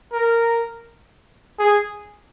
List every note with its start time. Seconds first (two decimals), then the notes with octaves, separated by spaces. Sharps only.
0.13 A#4
1.59 G#4